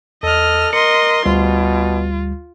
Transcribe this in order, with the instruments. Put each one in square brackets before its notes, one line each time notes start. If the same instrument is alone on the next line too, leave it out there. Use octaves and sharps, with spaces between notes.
[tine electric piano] E2 [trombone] A4 [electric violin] D#5 F6
[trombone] A#4 [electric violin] D#5 C6 [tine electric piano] C#7
[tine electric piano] D2 G3 [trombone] B2 [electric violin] F4